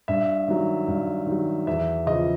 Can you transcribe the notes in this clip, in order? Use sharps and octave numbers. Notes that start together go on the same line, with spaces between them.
G2 E5
D#3 F#3
G2
D#3 F#3
E2 E5
C#3 F3 D#5